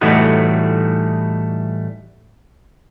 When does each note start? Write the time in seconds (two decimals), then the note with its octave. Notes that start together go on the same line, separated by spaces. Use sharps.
0.01 A2 E3 G3 A3 D#4 F#4